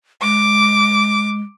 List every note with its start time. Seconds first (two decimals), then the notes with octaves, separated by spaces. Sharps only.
0.22 G#3 D6